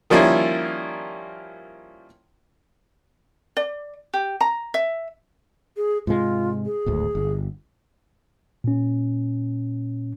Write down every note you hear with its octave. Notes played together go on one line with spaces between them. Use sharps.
D#3 F3 G3 A#3 C#4 E4
D5
G4
A#5
E5
G#4
G#2 C3 G#3 F4
G#4
D1 G#1 D2
G1
A#2 C#4